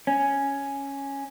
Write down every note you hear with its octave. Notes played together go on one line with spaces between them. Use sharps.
C#4